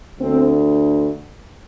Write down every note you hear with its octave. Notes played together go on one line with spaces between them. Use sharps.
D2 D3 C4